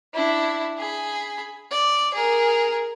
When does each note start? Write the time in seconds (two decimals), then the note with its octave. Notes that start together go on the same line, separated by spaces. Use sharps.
0.14 D4 E4
0.78 G#4 B5
1.71 D5
2.14 G#4 A#4